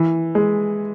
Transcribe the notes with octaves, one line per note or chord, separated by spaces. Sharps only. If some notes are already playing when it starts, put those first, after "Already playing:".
Already playing: E3
G#3